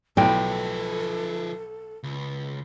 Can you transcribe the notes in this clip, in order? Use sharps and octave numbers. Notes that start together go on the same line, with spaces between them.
B1 A2 F3 A4 B4 G5
C#2